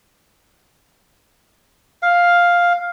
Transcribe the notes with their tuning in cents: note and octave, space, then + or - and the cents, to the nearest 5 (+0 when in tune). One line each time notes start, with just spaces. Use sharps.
F5 +5